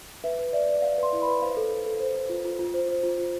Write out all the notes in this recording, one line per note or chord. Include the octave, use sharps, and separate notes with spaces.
B4 E5
B4
D5 E5
D5
D5 F5
B4 C6
E4
B5
B4
C5 F5
A4
A4
A4
C5
C5
F4
F4
F4
C5
C5
F4
F4